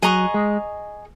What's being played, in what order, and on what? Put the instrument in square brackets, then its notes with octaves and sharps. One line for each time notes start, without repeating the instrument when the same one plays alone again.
[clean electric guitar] F#3 [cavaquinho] G#4 D#5 A#5 C#6
[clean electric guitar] G#3